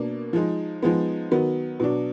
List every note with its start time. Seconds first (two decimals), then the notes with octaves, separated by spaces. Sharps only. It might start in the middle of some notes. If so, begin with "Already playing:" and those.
Already playing: B2 A#3 D4
0.33 F3 G#3 D#4
0.83 F3 G#3 B3 D#4
1.31 D#3 F#3 B3
1.80 B2 F#3 D4